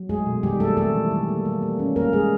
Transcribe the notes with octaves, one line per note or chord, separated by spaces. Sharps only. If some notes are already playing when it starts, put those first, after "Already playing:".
Already playing: F#3
G#3 A3 G#4
B2
D#3 G3 G4
G#3 A3 A4
C3 A3 A4
E3
G3
A#3
G3
A#3
C#4
G3 A#3 A#4
G#3 A#3 G#4